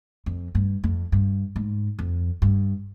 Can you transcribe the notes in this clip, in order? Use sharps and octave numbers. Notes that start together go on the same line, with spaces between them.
F2
G2
F2
G2
G#2
F2
G2